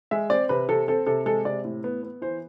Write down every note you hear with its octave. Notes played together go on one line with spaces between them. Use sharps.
G#3 E5
C4 D5
C3 B4
C3 A4
C4 A4
C3 A4
G#3 A4
C3 D5
A2
B3
B3
E3 C5